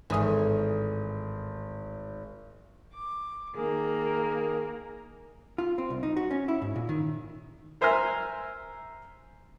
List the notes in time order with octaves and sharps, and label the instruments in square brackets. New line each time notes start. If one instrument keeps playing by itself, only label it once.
[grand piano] G#1 D#6 [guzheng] A2 E3
[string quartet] D6
[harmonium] D#3 G#4 [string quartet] A#3 A#4
[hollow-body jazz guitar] F4
C4
C2
D#4
F#4
C#4
E4
G#2
A#2
D#3
[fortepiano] A#4 C5 E5 G#5 A#5 F6